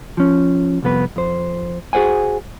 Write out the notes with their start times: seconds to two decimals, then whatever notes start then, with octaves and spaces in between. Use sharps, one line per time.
0.17 F3 C#4
0.83 C2 F2 B3 B4
1.16 F2 C5
1.93 F#4 G#4 A#4 C5 F#5 G#5